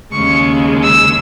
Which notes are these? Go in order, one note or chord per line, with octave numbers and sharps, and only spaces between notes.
D#2 C#3 G#3 C#6
E6